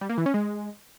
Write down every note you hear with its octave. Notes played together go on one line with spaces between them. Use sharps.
G3
A#3
E3
C#4
G#3